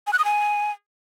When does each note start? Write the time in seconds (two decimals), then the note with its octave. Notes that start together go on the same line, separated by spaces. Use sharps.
0.07 G#5
0.13 F#6
0.19 D#6
0.25 G#5